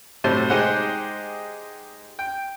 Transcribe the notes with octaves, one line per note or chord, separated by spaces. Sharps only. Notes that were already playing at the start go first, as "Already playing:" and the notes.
A2 C3 F#3 G3 C5 A5
G#3 D#4 G4 G#4 C5 F#5
G5